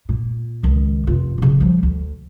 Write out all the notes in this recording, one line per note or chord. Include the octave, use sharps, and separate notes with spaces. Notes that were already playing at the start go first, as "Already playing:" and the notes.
A#2
C#2 D#3
F1 F4
D1 C#3
F3 G3
D2